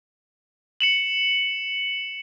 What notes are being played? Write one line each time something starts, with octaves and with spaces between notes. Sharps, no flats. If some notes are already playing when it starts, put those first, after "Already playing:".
C#7 E7 F#7